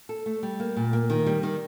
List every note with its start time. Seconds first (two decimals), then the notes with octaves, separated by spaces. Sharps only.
0.09 A4
0.26 A3
0.43 G3
0.60 A#3
0.76 A#2
0.93 A#3
1.10 D#3
1.26 G3
1.43 D#3